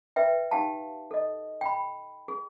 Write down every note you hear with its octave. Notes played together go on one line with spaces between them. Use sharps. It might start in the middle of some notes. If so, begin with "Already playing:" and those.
B4 E5 G5
D#4 G4 F5 G5 A5
A4 D#5
G5 B5
G#4